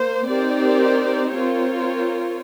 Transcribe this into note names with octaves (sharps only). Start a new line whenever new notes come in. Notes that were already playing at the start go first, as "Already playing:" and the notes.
Already playing: A#3 C5
C4 D#4 G4 A#4 D5
C4 F4 A#4 C#5